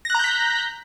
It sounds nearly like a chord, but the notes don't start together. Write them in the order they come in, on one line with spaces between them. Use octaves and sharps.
A#6 F#6 A#5 G6 B6